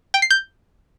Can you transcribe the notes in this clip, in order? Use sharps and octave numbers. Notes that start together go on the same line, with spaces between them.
G5
C7
G6